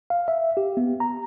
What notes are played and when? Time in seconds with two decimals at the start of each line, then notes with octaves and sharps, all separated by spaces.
0.10 F5
0.28 E5
0.57 G4
0.77 B3
1.00 A#5